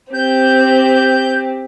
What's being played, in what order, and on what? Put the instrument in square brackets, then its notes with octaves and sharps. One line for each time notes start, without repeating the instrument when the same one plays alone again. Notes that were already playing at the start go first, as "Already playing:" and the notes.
[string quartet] C4 G4 [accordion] G6